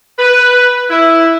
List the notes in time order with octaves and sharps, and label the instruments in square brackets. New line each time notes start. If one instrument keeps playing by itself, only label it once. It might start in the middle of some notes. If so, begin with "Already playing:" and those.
[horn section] B4
E4